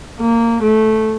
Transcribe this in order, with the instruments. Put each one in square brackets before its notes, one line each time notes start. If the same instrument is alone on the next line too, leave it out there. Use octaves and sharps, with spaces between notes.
[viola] A#3
A3